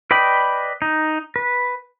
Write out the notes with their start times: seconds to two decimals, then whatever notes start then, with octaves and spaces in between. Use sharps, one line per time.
0.11 B4 D5 D#5 G5 B5
0.82 D#4
1.36 B4